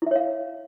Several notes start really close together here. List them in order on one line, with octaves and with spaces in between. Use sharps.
E4 E5 C#5 F5